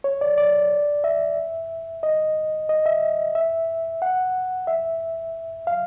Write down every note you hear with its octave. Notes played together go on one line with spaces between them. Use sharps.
C#5
D5
D5
E5
D#5
D#5
E5
E5
F#5
E5
F5